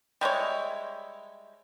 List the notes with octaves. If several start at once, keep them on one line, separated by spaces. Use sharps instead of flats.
G3 G#3 E4 C#5